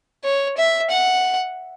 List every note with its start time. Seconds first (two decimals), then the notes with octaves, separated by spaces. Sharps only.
0.24 C#5
0.58 E5
0.90 F#5